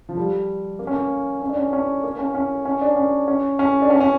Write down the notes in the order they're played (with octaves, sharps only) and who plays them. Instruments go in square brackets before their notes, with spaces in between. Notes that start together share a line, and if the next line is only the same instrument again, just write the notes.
[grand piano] F3
G3
A#3
C#4
A#3
C#4
D4
C#4
C#4
A#3
C#4
C#4
C#4
D4
C#4
C#4
C#4
D4
C#4
C#4